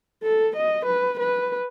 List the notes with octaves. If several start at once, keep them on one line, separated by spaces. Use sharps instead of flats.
A4
D#5
B4
B4